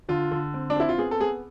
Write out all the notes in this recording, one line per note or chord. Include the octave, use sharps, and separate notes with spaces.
D3 F4
D3
C4
D4
C4 E4
F4
B3 G#4
A4
B3 G#4